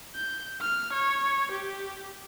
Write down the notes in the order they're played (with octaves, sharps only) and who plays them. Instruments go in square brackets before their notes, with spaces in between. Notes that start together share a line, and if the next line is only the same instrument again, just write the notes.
[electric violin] G6
F6
C#5
G4